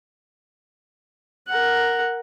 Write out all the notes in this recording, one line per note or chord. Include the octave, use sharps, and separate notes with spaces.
A#4 F#5